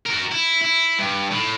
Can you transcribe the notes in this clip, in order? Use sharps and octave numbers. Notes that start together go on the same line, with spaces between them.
F#4 A#4
E4
E4
G2
A2